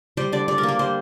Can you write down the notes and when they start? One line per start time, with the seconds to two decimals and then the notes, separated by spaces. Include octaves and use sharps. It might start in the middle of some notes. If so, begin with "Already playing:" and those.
0.17 G3 C5
0.32 D3 D5
0.48 D3 D5
0.58 A#4
0.63 A#3
0.68 A#4
0.79 G3 C5